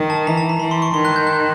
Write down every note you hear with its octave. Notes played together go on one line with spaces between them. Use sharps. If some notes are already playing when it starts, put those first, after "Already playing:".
Already playing: D#3
A5
E3 A#5
A5
A#5
E3 B5
C6
C#6
D#3 C6
F#6
G6
F#6